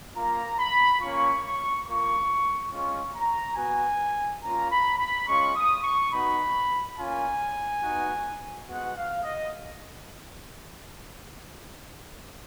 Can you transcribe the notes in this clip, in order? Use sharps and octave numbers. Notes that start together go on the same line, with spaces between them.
A#3 F4 A#5
B5
A#3 C#4 F4 C#6
C#6
A#3 F4 C#6
G#3 C#4 F4 C#6
A#5
B3 F#4 G#5
A#3 C#4 F4 A#5
B5
B5
G#3 C#4 F4 C#6
D#6
C#6
B3 D#4 F#4 B5
A#3 C#4 F4 G#5
B3 D#4 F#4
G#3 B3 F#4 F#5
F5
D#5